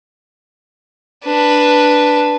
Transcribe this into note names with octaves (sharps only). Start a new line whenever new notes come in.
D4 B4